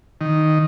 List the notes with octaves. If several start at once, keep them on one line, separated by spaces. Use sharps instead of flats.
D#3